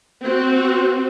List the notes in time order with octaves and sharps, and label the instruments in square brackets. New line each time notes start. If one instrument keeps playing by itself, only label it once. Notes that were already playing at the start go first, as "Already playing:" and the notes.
[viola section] C4 F#4